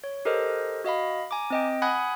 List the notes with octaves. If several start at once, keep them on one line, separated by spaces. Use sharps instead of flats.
C#5
G4 A4 A#4 C5 D#5
F#4 D#5 F5 B5
G#5 A#5 D6
C4 D#5 G5
F#5 G#5 B5 D#6 F#6 G#6